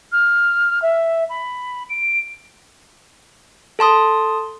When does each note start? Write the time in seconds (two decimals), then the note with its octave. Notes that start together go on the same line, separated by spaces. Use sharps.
0.12 F6
0.82 E5
1.30 B5
1.90 D7
3.79 A4 A5 C6 D#6